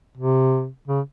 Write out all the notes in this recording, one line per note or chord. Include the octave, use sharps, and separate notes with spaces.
C3
C#3